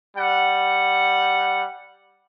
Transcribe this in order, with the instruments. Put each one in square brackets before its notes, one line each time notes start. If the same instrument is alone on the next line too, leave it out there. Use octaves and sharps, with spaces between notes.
[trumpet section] G3 F#5